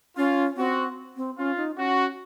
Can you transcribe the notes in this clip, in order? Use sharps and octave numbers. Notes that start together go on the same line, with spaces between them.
C#4 F4
C4 F#4
C4
C#4 F4
D#4
C#4 F#4